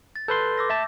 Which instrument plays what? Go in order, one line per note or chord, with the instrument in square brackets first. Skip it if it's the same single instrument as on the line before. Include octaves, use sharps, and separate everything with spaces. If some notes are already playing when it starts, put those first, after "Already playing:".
[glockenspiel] A6
[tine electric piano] A4 B4 C6 [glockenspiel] G6
[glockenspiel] D6 E6 A#6
[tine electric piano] E5 A5